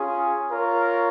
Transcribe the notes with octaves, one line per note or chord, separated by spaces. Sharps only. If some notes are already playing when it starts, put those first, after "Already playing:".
Already playing: C#4 F4 G#4
F4 A#4 C#5